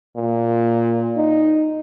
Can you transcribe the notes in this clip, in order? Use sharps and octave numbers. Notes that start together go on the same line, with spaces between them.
A#2
D#4